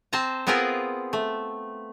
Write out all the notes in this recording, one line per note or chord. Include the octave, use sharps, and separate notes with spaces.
C4 C5 A5 A#5
B3 C4 F4 G#4 A#4 B4
A3